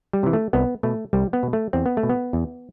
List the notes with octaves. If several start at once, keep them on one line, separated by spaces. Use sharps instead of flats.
G3
C3 E3
A3
C2 B3
B2 A3
C2 G3
B3
B2
A3
E2 C4
B3
A3
B2
B3
E2